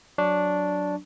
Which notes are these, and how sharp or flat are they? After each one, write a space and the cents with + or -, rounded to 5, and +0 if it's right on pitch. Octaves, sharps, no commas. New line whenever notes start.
F#3 -5 D4 -5 C#6 +0